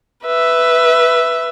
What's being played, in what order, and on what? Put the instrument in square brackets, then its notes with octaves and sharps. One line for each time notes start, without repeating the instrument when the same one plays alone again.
[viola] B4 E5